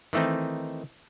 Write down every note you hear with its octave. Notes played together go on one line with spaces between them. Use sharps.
D#3 E3 A3 C4 D#4